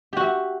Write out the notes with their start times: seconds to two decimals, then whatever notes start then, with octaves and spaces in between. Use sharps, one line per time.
0.13 G4
0.17 F#4
0.21 E5